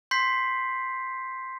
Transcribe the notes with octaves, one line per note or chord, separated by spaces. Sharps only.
C6 G6 B6 C7